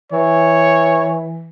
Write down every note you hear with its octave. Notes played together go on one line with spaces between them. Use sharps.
E3 C#5